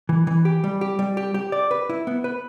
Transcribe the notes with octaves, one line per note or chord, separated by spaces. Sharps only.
E3
E3
G4
G3
G4
G3
G4
G4
D5
B4
E4
B3
B4